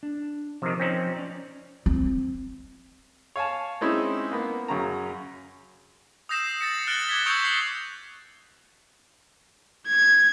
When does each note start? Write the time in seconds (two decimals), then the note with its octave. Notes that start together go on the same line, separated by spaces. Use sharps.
0.03 D4
0.62 C3 D#3 F3
0.80 C4 C#4 D#4
1.16 C#4 D5
1.86 C4
3.36 C#5 F5 G#5 A5
3.81 G#3 C4 C#4 D#4 E4
4.32 A#3 B3
4.68 F#2 C#3 A#5
6.29 D#6 E6 G6 A#6 C7 E7
6.61 A6 A#6 C#7
6.87 F6 F#6 A6 D7 F#7 G7
7.09 D6 G#6 B6
7.26 C#6 D#6 E6 G6 C#7 D7
7.45 C7
9.87 G#6